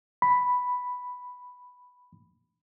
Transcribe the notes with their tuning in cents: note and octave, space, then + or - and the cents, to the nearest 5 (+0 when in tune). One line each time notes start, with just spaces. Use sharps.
B5 +0